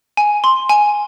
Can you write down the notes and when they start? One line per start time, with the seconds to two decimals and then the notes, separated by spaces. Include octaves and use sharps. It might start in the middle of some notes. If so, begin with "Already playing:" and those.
0.17 G#5
0.44 C6
0.69 G#5